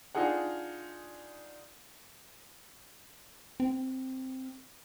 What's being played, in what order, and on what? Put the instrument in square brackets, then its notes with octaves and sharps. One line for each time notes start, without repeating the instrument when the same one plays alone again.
[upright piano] D4 D#4 F4 G#4 F#5
[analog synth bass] C4